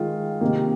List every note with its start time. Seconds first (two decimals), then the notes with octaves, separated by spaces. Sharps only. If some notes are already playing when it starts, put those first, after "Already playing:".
Already playing: D#3 G#3 F4
0.41 C3 D#3 A#3